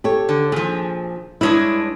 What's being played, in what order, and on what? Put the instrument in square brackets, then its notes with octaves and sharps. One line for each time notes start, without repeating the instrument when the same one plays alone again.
[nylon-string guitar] G4 A4 C#5
[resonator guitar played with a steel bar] D3
[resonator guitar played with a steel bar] A#2 F3 [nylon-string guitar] G#4
[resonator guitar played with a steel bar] G2 G#3 D4 [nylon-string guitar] E4 C#5